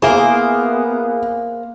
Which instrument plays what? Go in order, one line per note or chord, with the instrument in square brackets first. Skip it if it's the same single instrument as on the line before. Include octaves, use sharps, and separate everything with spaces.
[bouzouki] A#3 C5 [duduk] B3 [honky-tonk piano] E4 G#4